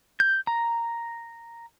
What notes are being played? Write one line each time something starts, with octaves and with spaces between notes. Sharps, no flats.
G6
A#5